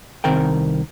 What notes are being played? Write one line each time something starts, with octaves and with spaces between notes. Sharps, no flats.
C2 D#3 C4 A#4 G5